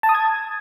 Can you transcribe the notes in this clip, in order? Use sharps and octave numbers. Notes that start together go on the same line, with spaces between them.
A5
D#6
G#6